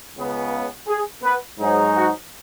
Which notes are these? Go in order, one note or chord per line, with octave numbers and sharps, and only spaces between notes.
C#2 C#3 B3
G#4
B3 B4
G#2 F#3 D#4 G#4
F#4